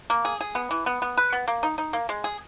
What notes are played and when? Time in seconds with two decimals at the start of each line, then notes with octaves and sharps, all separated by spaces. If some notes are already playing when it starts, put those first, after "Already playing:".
0.10 A#3
0.25 G#4
0.41 G#4
0.55 B3
0.71 E3
0.86 B3
1.02 B3
1.17 B4
1.33 B3
1.48 A#3
1.63 D#4
1.78 D#4
1.93 A#3
2.09 G#3
2.24 G#4